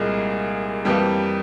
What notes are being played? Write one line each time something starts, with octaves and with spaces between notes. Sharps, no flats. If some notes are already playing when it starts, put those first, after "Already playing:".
Already playing: C2 A#2 G3 G#3 A#3 G#4
F2 E3 G3 A#3 G4